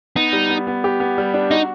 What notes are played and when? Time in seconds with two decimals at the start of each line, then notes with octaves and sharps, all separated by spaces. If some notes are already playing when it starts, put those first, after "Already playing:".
0.16 B3 D#4
0.33 G3
0.50 B3
0.67 B3
0.84 G4
1.00 B3
1.18 G3
1.34 D4
1.51 D#4 F#4